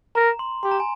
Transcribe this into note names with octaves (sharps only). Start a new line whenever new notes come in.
A#4 A#5
C6
G4 C6
A#5
G#5